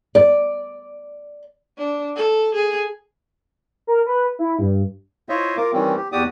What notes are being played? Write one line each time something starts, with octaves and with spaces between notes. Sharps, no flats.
D5
D4
A4
G#4
A#4
B4
E4
G2
E4 F4 C5 C#5 D#5 E5
F4 A#4 D6
D#3 E3 G3 C4 C#4
G4
E2 F#4 G4 D5 D6 D#6